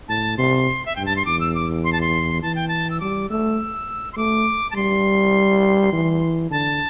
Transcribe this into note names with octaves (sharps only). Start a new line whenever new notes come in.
A2 A5
C3 C6
E5
G2 G5
A5
C6
E2 D6
E6
D6
C6
A5
C6
E3 A5
G5
A5
E6
G3 D6
A3 E6
C6
A3 D6
A5
G3 C6
E3
D3 A5